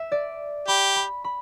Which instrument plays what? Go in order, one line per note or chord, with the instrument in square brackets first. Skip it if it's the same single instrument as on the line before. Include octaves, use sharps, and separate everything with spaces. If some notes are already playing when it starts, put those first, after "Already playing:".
Already playing: [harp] E5
D5
[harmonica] G4 [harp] B5
[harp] B5
B5